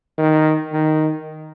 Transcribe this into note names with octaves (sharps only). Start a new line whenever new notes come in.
D#3
D#3